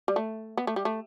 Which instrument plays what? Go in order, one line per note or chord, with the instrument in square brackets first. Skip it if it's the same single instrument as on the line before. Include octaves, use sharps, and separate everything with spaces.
[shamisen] G3
A3
B3
A3
G3
A3